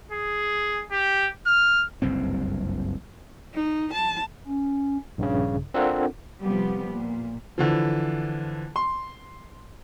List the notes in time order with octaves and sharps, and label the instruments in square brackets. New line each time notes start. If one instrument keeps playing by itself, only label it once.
[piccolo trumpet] G#4
G4
F6
[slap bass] F#1 C2 G2 C4
[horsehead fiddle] D#4
A5
[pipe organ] C#4
[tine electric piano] A#1 G2 C#3
C4 D4 F4 A4 A#4 F#5
[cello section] C3 F3 G3 B3 G4
A#2
[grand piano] D3 E3 F3
C6